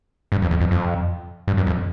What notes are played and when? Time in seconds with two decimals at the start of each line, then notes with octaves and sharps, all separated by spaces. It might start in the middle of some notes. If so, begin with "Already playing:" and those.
0.32 G2
0.42 F2
0.51 E2
0.60 F2
0.71 F2
1.48 G2
1.57 F#2
1.67 F2